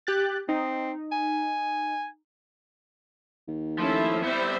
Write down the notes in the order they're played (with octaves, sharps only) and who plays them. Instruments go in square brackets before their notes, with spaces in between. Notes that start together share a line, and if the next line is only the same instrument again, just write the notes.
[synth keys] G4 F#6 A6
[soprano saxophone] C4 [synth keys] D#4
[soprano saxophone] G#5
[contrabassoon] D#2
[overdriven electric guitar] F3 [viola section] A3 C#4 E5 [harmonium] E4
[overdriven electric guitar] G3 B3 [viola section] C4 C5 E5